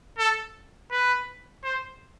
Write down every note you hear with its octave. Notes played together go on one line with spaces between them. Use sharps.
A4
B4
C5